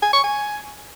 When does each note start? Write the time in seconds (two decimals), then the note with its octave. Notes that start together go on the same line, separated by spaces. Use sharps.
0.02 G#5
0.13 C#6
0.24 G#5